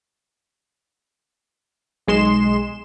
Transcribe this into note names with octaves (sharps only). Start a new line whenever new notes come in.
B1 G#3 C6 E7